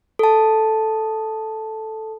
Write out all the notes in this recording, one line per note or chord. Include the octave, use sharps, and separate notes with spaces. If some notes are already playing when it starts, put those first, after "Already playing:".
A4 A5